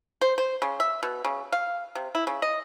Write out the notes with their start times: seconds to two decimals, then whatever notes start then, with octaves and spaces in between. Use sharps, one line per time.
0.21 C5
0.38 C5
0.62 C#3
0.80 E5
1.03 B2
1.25 C#3
1.52 F5
1.95 C3
2.15 E4
2.27 C#3
2.42 D#5